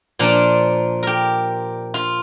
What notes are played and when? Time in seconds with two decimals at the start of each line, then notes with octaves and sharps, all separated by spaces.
0.19 A#2 F3 D4 F4
1.03 G4 A#4
1.94 F4